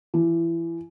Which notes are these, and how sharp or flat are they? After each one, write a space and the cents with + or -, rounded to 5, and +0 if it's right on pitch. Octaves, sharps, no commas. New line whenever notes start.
E3 +25